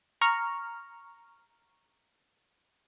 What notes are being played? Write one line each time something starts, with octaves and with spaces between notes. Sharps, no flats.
A#5 C#6 F6